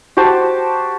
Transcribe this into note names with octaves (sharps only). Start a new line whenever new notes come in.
F#4 G4 C5 A5